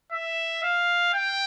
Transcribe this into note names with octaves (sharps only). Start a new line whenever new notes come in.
E5
F5
G5